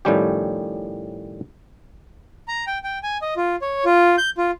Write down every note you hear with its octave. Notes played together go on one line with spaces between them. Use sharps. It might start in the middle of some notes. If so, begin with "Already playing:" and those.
A2 D#3 F3 G3 C#4 G4
A#5
G5
G5
G#5
D#5
F4
C#5
F4
G6
F4